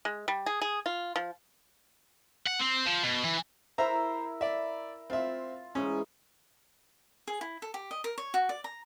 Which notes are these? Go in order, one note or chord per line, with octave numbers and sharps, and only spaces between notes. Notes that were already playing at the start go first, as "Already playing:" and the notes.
G#3
G3
G#4
G#4
F4
F3
F#5
C4
F3
B2
E3
E4 A#4 C5 E5 A#5
D5 E5
C4 F4 E5
G#2 E3 C#4
G#4
E4
A4
G4
D#5
A#4
C#5
F#4
D5
A#5